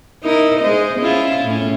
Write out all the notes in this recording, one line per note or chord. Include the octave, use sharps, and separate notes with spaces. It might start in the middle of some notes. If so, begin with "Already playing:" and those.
D#4 E4 A#4
G#3 C5 D#5
C#4 E4 F4
A2 C#4